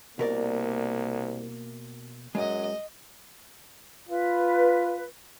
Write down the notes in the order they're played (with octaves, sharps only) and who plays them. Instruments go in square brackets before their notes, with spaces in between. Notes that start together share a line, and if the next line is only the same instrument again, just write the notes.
[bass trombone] C2 [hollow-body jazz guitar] B2 A#4 D5 [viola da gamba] A#3
[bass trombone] F#2 [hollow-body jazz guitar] G#3 [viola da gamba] D#5
[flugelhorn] F4 [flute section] B4